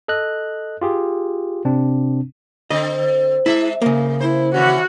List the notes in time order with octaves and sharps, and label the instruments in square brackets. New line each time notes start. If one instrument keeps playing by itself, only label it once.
[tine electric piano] A4 D#5 F#6
F4 G4 G#4
C3 C4 D4
[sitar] D3 C4 [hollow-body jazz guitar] D#5
[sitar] G#3 E5 [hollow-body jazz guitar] E4
[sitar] A2 [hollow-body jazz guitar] C#3 A#3
[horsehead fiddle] E4 [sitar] C5
[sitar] D#3 E3 C#4 [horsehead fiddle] F#4 F#5